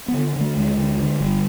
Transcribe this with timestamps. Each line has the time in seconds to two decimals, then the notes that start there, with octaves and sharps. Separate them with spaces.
0.08 B3
0.14 D3
0.36 D3 A3
0.57 D2 G#3
0.78 D3
0.99 D3
1.20 G1 G3